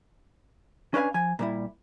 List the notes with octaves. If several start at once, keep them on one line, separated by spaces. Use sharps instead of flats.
C#4 D4 B4 F5 G#5
F3 G#5
A#2 G3 E4